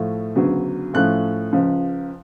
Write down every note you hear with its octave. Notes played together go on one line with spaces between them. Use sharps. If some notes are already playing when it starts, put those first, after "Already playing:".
Already playing: A2 F3 A3
D2 C#3 F#3 B3
A2 F3 A3 C#4 F#6
C#2 C#3 F3